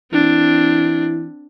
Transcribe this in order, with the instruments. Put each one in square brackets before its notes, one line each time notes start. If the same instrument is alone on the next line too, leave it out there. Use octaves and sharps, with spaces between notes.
[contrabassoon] E3 [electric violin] C4 D4